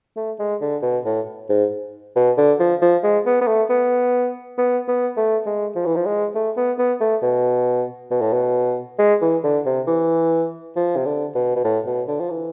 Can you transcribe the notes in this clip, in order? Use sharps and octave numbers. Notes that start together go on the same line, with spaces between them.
A3
G#3
D3
B2
A2
G#2
B2
D3
F3
F3
G#3
B3
B3
A3
B3
B3
B3
A3
G#3
F3
E3
F3
G#3
A3
B3
B3
A3
B2
B2
A2
B2
G#3
E3
D3
C3
E3
F3
C3
D3
B2
B2
A2
B2
D3
F3
E3